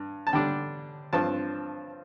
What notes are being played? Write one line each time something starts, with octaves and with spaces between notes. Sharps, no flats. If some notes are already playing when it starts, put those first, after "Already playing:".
Already playing: G2
A5
D3 G3 D4 G5
G2 F3 C4 A5